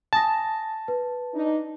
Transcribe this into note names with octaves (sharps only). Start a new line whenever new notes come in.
G#5 A5 D#6 A#6
B4
D4 D#4